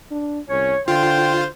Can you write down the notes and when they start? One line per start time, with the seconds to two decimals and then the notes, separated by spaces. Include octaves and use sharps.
0.11 D4
0.50 C2 C#4 C#5
0.88 D3 F4 C5 G5